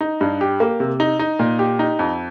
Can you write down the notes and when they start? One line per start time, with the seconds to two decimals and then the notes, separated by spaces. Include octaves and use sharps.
0.01 D#4
0.21 G2
0.41 G4
0.60 A#3
0.80 C3
1.00 D#4
1.19 D#4
1.39 A#2
1.59 G4
1.79 D#4
1.99 F2